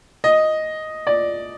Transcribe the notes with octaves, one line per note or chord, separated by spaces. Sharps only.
D#5
D5